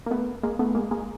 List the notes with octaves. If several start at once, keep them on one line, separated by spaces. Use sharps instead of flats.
A#3
A3 B3
G#3 A#3
A3 B3
G#3 A#3
G#3 A#3